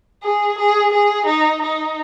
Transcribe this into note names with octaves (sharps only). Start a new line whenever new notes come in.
G#4
G#4
G#4
D#4
D#4